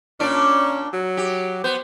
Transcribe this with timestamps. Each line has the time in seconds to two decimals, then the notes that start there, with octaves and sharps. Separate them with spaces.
0.20 A#2 C#4 D4 D5
0.93 F#3
1.17 G4
1.64 B3 C5